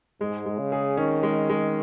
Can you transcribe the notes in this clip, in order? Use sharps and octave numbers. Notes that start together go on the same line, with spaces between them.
G#2 G#3
G#3
C#3
G#4
D#3 C#4
G#3
G#3